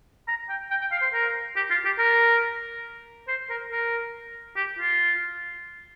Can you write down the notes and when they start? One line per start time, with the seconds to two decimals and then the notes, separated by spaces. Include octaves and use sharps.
0.28 A#5
0.49 G5
0.71 G5
0.81 G5
0.92 F5
1.02 C5
1.13 A#4
1.56 G4
1.70 F4
1.85 G4
1.99 A#4
3.28 C5
3.49 A#4
3.71 A#4
4.56 G4
4.79 F4